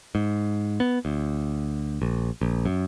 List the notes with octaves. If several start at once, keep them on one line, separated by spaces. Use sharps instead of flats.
G#2
B3
D2
A#1
A#1
F#2